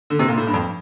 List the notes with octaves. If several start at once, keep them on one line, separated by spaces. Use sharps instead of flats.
D3
C3
A#2
A2
G2
F2